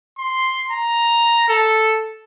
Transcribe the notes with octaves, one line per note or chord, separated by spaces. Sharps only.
C6
A#5
A4